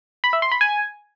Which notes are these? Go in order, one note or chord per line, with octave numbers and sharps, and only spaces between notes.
B5
E5
C6
B5
G#5